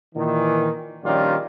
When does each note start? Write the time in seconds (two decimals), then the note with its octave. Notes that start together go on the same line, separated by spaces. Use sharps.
0.15 A#2 D#3 E3
1.03 A#1 D#3 G3 C#4 F4 D5